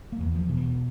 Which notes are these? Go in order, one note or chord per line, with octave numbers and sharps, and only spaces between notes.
A#3
E2
F3
B2
E3